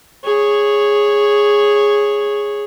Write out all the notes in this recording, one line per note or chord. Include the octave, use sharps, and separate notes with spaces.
G#4 C#5